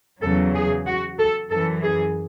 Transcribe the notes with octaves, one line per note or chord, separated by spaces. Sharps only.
E2 C#3 F#3 A4
G#4
F#4
A4
F#2 E3 A4
G#4